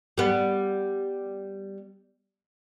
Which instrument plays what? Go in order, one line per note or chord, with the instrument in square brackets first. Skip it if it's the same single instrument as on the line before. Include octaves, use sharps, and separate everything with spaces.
[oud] G3 B3